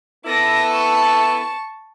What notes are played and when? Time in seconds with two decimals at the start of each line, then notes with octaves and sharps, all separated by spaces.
0.25 B3 E4 A4 D6 A#6
0.71 A5 C#6